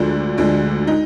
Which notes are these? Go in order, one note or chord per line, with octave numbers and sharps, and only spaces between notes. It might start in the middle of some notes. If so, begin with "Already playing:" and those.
Already playing: D2 D3 F3 G#3 D4
D2 D3 F3 G#3
D#4